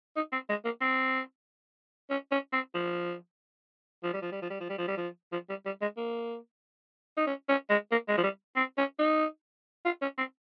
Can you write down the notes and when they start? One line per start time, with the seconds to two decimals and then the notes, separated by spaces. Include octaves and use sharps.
0.16 D#4
0.32 C4
0.49 G#3
0.65 A#3
0.81 C4
2.10 C#4
2.31 C#4
2.53 C4
2.74 F3
4.03 F3
4.13 G3
4.22 F3
4.32 G3
4.42 F3
4.50 G3
4.60 F3
4.69 G3
4.78 F3
4.88 G3
4.97 F3
5.32 F3
5.49 G3
5.66 G3
5.81 G#3
5.97 A#3
7.17 D#4
7.27 C#4
7.49 C#4
7.70 G#3
7.91 A#3
8.08 G#3
8.17 F3
8.23 G3
8.56 C4
8.78 C#4
8.99 D#4
9.85 F4
10.01 C#4
10.18 C4